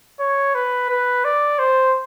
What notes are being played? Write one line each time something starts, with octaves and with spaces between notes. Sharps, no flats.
C#5
B4
B4
D5
C5